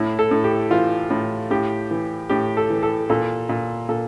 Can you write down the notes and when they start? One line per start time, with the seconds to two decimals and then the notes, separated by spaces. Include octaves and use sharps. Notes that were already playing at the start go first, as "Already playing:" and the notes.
Already playing: A2 E4
0.19 A4
0.31 A2
0.44 G4
0.71 E3 F4
1.10 A2
1.51 A2 G4
1.91 E3
2.29 A2 G4
2.57 A4
2.70 E3
2.83 A4
3.10 A#2 A4
3.49 A#2
3.89 A#2 A4